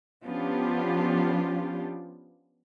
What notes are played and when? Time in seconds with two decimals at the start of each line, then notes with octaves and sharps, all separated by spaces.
0.25 F3 B3 C#4 D4 F4 G4